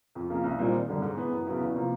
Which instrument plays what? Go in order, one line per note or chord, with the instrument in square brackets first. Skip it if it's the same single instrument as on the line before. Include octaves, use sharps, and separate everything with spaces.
[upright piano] F2
C#3 F3 A#3
C2
A#2 G3 C4 D#4
G#1
F#2 D3 G3
G#2
E3 G#3 B3
F#2
C#3 F#3 B3 E4
E2
C3 F3 A#3